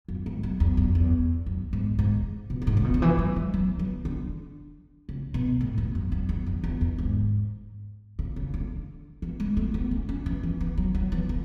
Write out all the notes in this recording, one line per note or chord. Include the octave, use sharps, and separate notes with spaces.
F#2
G#2
F#2
E2
F#2
E2
F#2
G#2
G#2
B2
A2
G#2
C#3
B2
D3
E3
F#3
G#3
F#3
E3
D3
C#3
B2
A2
E2
F#2
F#2
E2
F#2
E2
E2
G#2
C#3
C#3
D3
E3
G#3
A3
B3
C#4
C#4
E3
E3
E3
F#3
F#3
E3
D3